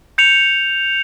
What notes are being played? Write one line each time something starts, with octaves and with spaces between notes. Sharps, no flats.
G6 C#7 F7